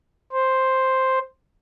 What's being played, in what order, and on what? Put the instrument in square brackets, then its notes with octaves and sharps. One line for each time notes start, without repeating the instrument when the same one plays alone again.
[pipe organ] C5